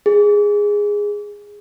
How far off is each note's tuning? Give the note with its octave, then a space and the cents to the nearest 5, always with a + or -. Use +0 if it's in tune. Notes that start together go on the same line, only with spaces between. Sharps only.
G#4 -10